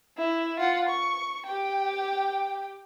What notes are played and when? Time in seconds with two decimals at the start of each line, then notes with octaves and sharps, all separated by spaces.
0.18 E4
0.60 F4 F#5
0.89 C#6
1.46 G4 G5